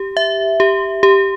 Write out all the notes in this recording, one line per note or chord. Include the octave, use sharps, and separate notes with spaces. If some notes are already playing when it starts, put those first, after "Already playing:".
Already playing: G4
E5
G4
G4